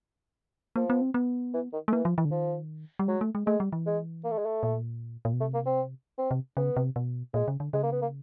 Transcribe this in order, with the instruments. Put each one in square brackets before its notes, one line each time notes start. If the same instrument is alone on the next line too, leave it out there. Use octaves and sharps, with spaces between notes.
[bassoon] F3 [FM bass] A#3
[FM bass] B3
C4
B3
[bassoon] E3
D#3
[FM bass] A3
[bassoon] E3 [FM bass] A#3
[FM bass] F3
E3
D3
[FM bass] D#3 [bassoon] F3
[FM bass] G3
[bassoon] F#3 [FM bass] G#3
[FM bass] A3
G#3
[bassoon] G#3 [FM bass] A3
[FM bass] G3
E3
[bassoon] G#3
A#3
A3
G#3
A3
[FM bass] A#2
A#2
B2
[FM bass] C3 [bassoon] A3
[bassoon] A#3
C4
C4
[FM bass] C3
[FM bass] C#3 [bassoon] B3
[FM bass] C3
B2
[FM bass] A#2 [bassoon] G#3
[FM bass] C#3
D3
[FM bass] C#3 [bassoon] G#3
[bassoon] A#3
B3
A#3